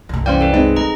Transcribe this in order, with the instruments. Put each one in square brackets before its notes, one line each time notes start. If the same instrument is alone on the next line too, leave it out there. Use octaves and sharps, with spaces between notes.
[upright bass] C2 F#2
[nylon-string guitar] E3 G3 C#4 [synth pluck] C5 F5 G5 [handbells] D5
[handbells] A4 B4
[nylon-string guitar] G#3 [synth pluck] C4 D#4 [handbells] G#4
[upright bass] G3 [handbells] G#4 D#5 A#5